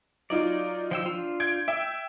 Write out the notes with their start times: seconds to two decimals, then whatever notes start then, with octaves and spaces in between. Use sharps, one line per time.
0.30 F#3 D#4 F4 D5
0.91 F3 G5 E6
1.06 D4 F4
1.40 G6 G#6 D7
1.68 E5 G5